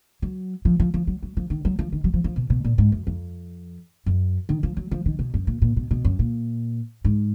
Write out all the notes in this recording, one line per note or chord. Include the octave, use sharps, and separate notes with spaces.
F#3
F3
F3
F3
F#3
F#3
F3
D#3
F#3
F3
D#3
F#3
F3
F3
B2
B2
A#2
G#2
F#2
F2
F#2
D#3
F3
F#3
F3
D#3
B2
F#2
A#2
A#2
B2
B2
F#2
A#2
G#2